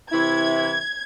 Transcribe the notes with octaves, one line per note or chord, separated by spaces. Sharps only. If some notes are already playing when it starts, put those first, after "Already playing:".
C3 E3 E4 G#6